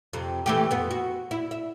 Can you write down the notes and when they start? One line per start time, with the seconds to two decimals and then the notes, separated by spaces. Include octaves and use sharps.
0.13 F2 C3
0.46 E3 A3 G4
0.71 F2 B3
0.91 F#4
1.31 E4
1.51 E5